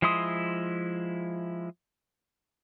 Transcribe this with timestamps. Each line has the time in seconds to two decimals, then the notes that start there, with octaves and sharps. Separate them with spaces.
0.02 F3 G#3 E4 C6 D#6